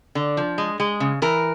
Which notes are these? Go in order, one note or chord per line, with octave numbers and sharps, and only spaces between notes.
D3
F3
G#3
G#3
C#3
E3 A#4